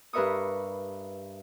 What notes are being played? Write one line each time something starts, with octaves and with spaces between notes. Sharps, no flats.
G2 A#4 B4 E5 C#6 D#6